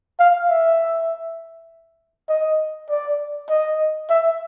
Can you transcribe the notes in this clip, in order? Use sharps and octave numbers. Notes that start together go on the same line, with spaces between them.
F5
E5
D#5
D5
D#5
E5